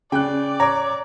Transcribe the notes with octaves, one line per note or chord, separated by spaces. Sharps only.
C#3 D5 G5 F#6
C#5 A#5 D6